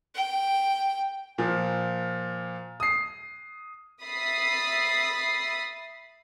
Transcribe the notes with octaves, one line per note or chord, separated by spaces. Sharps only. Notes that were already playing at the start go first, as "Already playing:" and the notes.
G5
A#2 F3
D#6 C7
E5 B5 D#6 A6 B6 C7